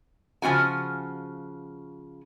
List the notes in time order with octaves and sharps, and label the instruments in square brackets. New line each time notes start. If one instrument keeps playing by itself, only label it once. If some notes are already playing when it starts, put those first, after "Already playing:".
[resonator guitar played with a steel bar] C#3 F3 C4 F#4 G#5